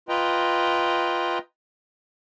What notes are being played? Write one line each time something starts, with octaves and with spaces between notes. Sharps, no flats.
F4 B4 D#5 G5 A#5